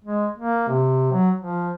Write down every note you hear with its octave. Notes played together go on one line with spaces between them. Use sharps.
G#3
A#3
C3
F#3
F3